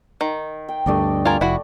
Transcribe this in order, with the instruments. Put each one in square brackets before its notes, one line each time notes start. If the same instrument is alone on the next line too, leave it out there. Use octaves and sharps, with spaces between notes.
[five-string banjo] D#3
[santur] G5
[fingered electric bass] D2 G2 [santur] A3 D5 D#5
[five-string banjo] F4 A#4 G#5
[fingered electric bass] F1 [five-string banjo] E4 F#4